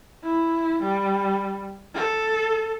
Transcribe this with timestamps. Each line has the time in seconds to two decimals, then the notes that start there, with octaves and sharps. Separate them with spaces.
0.23 E4
0.82 G3
1.94 A4